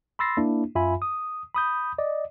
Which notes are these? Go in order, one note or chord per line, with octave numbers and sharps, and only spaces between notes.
B5 C6 E6 A6 A#6 C7
A#3 D4 E4
F#2 F4 E5 G#5 B5
D#6
B5 D#6 G6
D5 D#5